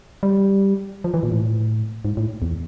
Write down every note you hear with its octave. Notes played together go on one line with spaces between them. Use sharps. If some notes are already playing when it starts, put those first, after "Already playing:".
G3
F3
E3
A#2
A2
G#2
A2
E2